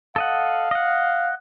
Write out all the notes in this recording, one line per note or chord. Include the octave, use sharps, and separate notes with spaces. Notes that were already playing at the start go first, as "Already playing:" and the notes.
A4 D#5 F5 F#5
D#5 F#5